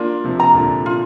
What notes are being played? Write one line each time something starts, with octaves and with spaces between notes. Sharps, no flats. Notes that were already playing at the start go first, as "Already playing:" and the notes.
Already playing: A#3 D4 F4
C3 F3
A#5
A#2 D3
F4